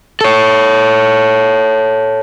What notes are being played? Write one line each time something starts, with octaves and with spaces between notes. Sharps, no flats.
A4 C#5